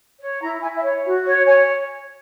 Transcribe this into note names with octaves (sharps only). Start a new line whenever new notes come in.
C#5
E4 A#5
E4 G#5
E5
C#5
F#4
C#5
C#5 G#5